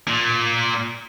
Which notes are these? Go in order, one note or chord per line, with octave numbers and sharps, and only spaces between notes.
A#2